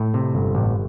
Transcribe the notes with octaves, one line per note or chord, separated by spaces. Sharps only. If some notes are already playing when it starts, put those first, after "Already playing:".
Already playing: A2
C3
G1
A1